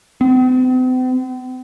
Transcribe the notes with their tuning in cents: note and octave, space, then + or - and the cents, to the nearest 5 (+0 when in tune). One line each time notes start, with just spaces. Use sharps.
C4 -45